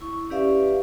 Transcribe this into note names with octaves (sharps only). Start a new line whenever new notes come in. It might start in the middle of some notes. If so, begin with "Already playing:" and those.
E4 C#6
C#4 G4 B4 D5 E5 F5